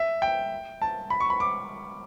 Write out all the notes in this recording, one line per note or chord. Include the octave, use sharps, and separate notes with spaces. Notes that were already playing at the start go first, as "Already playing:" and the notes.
Already playing: E5
G5
A5
B5
C#6
B5
D6